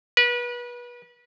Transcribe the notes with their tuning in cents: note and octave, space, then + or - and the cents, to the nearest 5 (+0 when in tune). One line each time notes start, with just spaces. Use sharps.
B4 -30